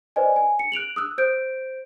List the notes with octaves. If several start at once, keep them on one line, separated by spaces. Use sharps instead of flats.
B4 C5 D5 D#5 G#5
G#5
C#7
F#6 D7 F7 F#7
D#6 E6 F#6
C5 G6 D7